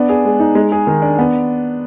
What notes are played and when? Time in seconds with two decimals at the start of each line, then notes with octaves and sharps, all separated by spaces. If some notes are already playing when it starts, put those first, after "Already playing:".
Already playing: B3 D4
0.09 G#4
0.25 G#3
0.40 D#4
0.55 G#3
0.72 G#4
0.87 D#3
1.02 D4
1.19 B3